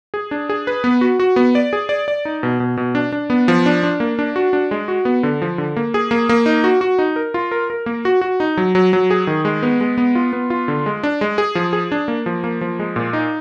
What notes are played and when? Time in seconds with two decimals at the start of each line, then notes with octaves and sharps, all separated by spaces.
0.14 G#4
0.31 D4
0.49 G#4
0.67 B4
0.84 B3
1.01 F#4
1.20 F#4
1.36 B3
1.55 D5
1.73 G#4
1.89 D5
2.08 D5
2.25 D#4
2.43 B2
2.60 B2
2.77 B2
2.95 D4
3.12 D4
3.30 B3
3.48 F3
3.66 D4
3.83 D4
4.00 A#3
4.19 D4
4.36 F#4
4.53 D4
4.71 G#3
4.88 F#4
5.05 B3
5.23 D3
5.42 F3
5.58 D3
5.76 A#3
5.94 G#4
6.11 A#3
6.29 A#3
6.46 D#4
6.64 F#4
6.81 F#4
6.99 D#4
7.16 A#4
7.34 F4
7.51 A#4
7.70 A#4
7.86 A#3
8.05 F#4
8.21 F#4
8.40 D#4
8.57 F#3
8.75 F#3
8.93 F#3
9.10 G#4
9.27 D#3
9.45 G#3
9.63 B3
9.81 G#3
9.98 B3
10.15 F4
10.33 B3
10.50 F4
10.68 D3
10.86 G#3
11.03 D4
11.21 G#3
11.38 G#4
11.55 F3
11.73 G#4
11.92 D4
12.08 A#3
12.26 F3
12.44 A#3
12.61 F3
12.79 G#3
12.96 A#2
13.13 D#4